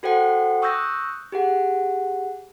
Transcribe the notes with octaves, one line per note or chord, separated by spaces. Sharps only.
F#4 A4 C5 F#5 G5
C#6 D#6 E6 F#6 G6 A#6
G4 G#4 F#5